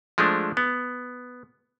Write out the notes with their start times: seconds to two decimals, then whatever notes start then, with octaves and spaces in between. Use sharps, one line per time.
0.18 F3 G#3 A3 D4
0.57 B3